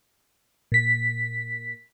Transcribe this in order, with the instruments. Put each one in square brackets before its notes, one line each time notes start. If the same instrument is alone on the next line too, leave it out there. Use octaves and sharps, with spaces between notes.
[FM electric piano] A#2 B6